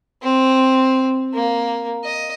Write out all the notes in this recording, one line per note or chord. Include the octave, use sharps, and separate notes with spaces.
C4
A#3
D#5